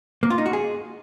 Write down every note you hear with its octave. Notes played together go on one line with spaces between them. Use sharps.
A#3
F4
D#4
F#4
G#4